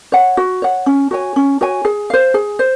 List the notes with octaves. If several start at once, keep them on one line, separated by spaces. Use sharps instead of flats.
C#5 F#5
F#4
C#5 F#5
C#4
F#4 C#5 G#5
C#4
F#4 C#5 G#5
G#4
C5 F5
G#4
C5